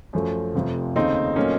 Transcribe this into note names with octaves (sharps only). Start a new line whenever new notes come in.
F#2 F3 A3
F1 F2 C3 F3 A3
D#2 C#3 A3 C4 D#4
A#2 F#3 A3 A#3 C#4